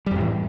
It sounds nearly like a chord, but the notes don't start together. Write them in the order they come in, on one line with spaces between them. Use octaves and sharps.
G3 F2 A2 E3